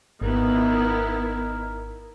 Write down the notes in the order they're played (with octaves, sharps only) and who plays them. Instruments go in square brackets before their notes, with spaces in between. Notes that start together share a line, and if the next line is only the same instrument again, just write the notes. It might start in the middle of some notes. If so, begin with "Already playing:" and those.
[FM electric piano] G#1 [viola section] D#3 B3 E4 [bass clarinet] A#4